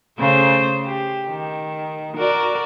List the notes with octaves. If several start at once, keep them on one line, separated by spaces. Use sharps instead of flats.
C#3 A3 C5
G4
D#3
F#4 A#4 D5